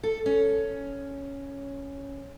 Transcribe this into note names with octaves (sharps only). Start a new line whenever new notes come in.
A4
C#4